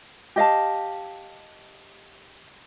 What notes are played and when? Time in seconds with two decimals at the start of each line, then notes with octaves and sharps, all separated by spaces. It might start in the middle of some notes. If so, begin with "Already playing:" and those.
0.36 G4 D#5 F5 A5